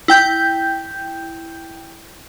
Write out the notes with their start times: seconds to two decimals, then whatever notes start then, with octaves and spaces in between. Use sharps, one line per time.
0.08 E4 G5 G6